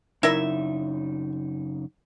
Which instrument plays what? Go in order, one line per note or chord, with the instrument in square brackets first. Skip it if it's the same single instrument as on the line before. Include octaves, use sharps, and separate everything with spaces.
[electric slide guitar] F#2 C#3 D#4 [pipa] E4 A#4 E5